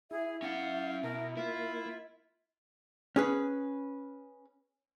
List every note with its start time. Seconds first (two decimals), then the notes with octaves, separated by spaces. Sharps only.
0.11 E4 G#4 E5
0.42 C#4 F5 F#5
1.03 B2 A#4
1.37 A#3 E4 F4
3.16 C#4 G#4 B4